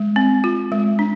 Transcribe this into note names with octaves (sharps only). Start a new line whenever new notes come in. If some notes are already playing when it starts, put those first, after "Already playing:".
Already playing: G#3
C4
F4
G#3
D4